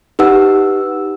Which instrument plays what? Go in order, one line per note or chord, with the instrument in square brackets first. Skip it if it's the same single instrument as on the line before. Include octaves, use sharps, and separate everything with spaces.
[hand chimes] D#4 G4 B4 F#5 E6